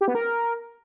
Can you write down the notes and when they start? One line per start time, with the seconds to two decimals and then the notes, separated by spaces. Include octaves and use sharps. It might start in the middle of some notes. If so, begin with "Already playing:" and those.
0.01 G4
0.08 B3
0.15 A#4